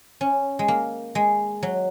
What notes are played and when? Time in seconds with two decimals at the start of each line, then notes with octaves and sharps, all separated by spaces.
0.21 C#4
0.59 G#3
0.68 A#3
1.15 G#3
1.63 F#3